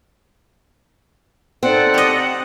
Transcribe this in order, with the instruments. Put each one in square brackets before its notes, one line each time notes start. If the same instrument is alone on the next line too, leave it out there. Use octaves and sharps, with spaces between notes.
[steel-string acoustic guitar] C4 [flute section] D#4 A4 D5 [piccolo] F#5
[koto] G4 D#5